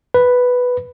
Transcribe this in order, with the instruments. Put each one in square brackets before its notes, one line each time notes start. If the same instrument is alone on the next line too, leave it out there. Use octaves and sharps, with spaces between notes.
[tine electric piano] B4